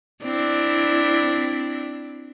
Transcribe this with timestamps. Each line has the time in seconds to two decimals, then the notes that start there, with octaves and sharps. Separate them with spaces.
0.23 C4 D4 E4